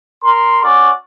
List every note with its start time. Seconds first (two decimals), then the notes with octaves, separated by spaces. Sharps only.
0.24 A#4 C6
0.63 C#4 F#4 D5